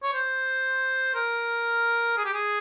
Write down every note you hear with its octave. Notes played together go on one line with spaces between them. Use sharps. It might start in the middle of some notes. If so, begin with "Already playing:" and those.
C#5
C5
A#4
G#4
G4
G#4